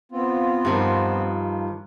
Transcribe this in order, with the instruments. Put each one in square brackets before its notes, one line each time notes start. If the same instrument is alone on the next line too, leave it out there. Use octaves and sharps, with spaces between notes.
[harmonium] B3 C4 F4
[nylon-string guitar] G2 D#3 F3